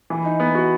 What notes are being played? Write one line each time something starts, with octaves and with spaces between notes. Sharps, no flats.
E3
D#4
B3
F#4